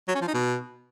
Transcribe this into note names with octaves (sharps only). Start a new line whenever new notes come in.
F#3
C#4
F3
D#4
B2